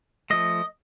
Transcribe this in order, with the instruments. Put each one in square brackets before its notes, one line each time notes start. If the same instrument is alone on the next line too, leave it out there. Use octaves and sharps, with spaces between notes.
[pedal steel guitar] F3 A3 D#5